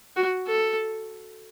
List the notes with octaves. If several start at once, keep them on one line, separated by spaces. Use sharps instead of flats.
F#4
A4